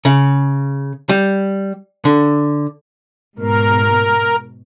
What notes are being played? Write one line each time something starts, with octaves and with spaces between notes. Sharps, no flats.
C#3
G3
D3
G#2 B2 A#4